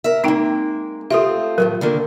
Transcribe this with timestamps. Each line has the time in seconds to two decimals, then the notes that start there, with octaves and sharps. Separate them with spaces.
0.04 A#4 E5
0.24 G#3 A#3 C4 D#4 G5
1.11 A3 C4 F4 G4 A4 E5 D#6
1.58 A2 D#3 F3 F#3 A#4
1.81 D3 D#3 A#3